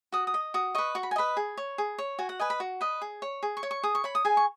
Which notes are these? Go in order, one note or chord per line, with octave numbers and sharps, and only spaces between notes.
F#4 D#6
D#6
D#5
F#4 D#6
B4 D#5 C#6
F#4 C#6
B5
G#5
B4 D#5 B5
G#4
C#5
G#4
C#5
F#4 G#5
F#5
B4 D#5 G#5
B5
F#4
B4 D#5
G#4
C#5
G#4
C#6
C#5
C#6
G#4 D#6
C#6
C#5 B5
D#6
G#4 G#5
C#6